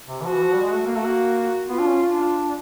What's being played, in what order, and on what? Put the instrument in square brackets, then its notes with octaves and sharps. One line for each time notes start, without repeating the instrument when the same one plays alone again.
[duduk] C3
E3
[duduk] F3 [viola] F#4
[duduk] E3
F3
G3
G#3
A3
A#3
[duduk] A3 [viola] F#4
[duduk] A#3
[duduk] B3 [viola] F4
[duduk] D4
C#4
D4